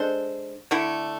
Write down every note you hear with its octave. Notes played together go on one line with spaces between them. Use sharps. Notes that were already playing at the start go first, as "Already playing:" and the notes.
Already playing: G#3 D4 A4 C5
D3 A3 E4